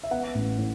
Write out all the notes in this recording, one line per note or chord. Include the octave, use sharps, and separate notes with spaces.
E5
B3 F#5
A1
A2